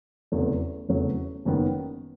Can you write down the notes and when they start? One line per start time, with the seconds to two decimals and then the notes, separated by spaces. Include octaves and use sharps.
0.32 F1 E2 C#3 F#3 A3
0.89 F1 E2 C#3 F#3 A3
1.45 F#1 F#2 D#3 G3 B3